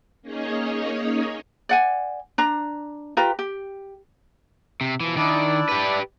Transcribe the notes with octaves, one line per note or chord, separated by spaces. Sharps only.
A#3 C#4 D#4 G#4 C#5 D#5
D5 F#5 G#5
D4 A#5
F4 G4 B4 A#5
G4
C3
B2 E3 F3
D#3 D4 E4 D5
G4 B4